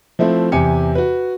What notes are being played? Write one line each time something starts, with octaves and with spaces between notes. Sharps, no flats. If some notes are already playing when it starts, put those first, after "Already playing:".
F3 A3 C4 E4
E2 C3 G4 G#5 C#7
F#4 B4